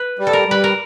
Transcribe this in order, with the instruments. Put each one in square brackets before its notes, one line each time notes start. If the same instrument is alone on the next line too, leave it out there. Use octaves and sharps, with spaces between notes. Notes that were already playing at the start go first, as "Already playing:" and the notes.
Already playing: [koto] B4
[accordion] G3
[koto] A4
A#4
[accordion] G3 [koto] B4
[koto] A#4